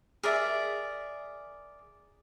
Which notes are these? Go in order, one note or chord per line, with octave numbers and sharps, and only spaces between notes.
G#4 A#4 D5 E5